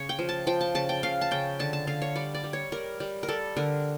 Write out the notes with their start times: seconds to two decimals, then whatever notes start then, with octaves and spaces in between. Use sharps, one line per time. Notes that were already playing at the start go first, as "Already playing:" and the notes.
Already playing: C#3 C#5
0.09 G5
0.19 F3
0.29 A5
0.47 F3 G5
0.61 A5
0.75 C#3 A5
0.89 G5
1.03 C#3 F5
1.21 A5
1.31 C#3 G5
1.59 D3 A5
1.73 A5
1.87 D3 F5
2.02 C#5
2.15 G3 D5
2.34 D5
2.44 G3
2.53 C#5
2.72 G3 A#4
3.00 G3
3.23 A#4
3.28 G3 A4
3.57 D3 A#4